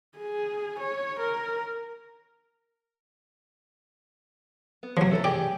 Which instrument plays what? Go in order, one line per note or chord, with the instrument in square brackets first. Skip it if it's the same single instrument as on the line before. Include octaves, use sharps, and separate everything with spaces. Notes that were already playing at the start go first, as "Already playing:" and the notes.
[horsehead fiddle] G#4
C#5
A#4
[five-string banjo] B3
[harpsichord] F3 F#3 [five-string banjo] C#5
[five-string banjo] B3 E4 A4
[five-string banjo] G4 G#4 [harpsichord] D5